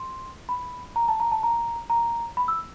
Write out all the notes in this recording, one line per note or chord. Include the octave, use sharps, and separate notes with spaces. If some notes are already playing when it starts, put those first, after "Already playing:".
Already playing: C6
B5
A#5
A5
A#5
A5
A#5
A#5
B5
E6